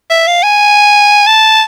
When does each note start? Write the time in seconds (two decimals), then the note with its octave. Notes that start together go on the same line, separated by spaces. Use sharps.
0.10 E5
0.27 F5
0.43 G#5
1.27 A5